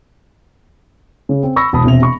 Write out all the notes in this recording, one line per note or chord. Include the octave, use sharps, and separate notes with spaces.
C#3
C4
B5 C#6 E6 A#6
E1 A5 B5 D#6
E1 C3 E5 F7
B5 C#6